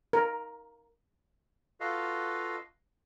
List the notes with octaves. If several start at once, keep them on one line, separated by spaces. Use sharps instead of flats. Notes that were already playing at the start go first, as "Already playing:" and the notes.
A#4
F4 F#4 A4 B4 D#5 F5